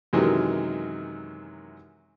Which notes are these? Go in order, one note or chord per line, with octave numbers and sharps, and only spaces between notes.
F#2 C3 D#3 E3 F#3 G#3